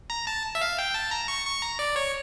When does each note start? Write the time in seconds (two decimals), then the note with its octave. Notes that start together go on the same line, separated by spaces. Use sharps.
0.10 A#5
0.27 A5
0.55 E5
0.61 F5
0.79 G5
0.94 A5
1.11 A#5
1.28 C#6
1.46 C#6
1.62 A#5
1.79 D5
1.96 C#5